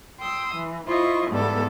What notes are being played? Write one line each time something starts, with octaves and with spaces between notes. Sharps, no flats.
G5 C6 D#6 E6
E3
E4 F4 C5 D#5 C#6
E2 G#2 G3 B3 A4